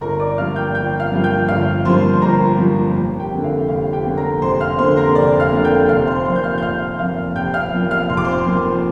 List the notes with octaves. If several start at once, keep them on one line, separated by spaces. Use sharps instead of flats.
G1 A#4 A#5
D5 D6
G2 F3 A#3 F5 F6
G5 G6
G1 G5 G6
F5 F6
G2 F3 A#3
G5 G6
G1 F5 F6
G2 F3 A#3 C5 C6
G1 A#4 A#5
G2 F3 A#3
F1
G4 G5
F2 D3 A#3
F5
F1 F5
G4 G5
F2 D3 A#3
A#4 A#5
F1 C5 C6
F5 F6
F2 D3 A#3 C5 C6
A#4 A#5
F1 D5
F5 F6
F2 D3 A#3
G5 G6
F1 F5 F6
C5 C6
F2 F3 A#3 C5 C6
G6
F5 F6
G6
F1 F5 F6
F2 F3 A#3 F5 F6
F1 G5 G6
F5 F6
F2 F3 A#3
F5 F6
F1 C6
D6
C5 C6
F2 F3 A#3